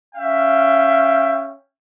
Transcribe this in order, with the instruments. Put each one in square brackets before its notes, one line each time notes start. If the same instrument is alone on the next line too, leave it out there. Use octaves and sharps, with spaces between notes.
[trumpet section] C#4 E5 F5 G5